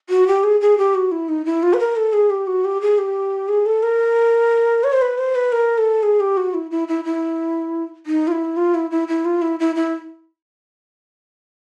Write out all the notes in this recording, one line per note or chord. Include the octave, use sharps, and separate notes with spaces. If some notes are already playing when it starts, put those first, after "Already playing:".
F#4
G4
G#4
G#4
G4
F#4
E4
D#4
E4
F4
B4
A#4
A4
G#4
G4
F#4
G4
G#4
G4
G#4
A4
A#4
C#5
C5
B4
C5
B4
A#4
A4
G#4
G4
F#4
E4
E4
E4
E4
D#4
F4
E4
F4
E4
E4
E4
F4
E4
E4
E4